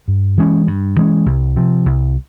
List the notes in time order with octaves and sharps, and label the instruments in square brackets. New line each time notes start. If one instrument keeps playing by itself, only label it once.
[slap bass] G2
E3 G#3 C#4
G2
E3 G#3 C#4
C2
C3 F3
C2